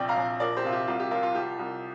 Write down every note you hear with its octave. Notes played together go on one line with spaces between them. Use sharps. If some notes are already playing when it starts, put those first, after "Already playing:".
Already playing: A#1 C3 D5 G5
F5 A#5
A#1
F3 A#4 D5
G4 C5
C3 F4
G4
C2 F4
G4
F3 F4 A#4
F4
F3 G4
C2